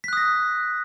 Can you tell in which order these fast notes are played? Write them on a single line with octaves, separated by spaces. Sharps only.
B6 F#6 D#6 A#6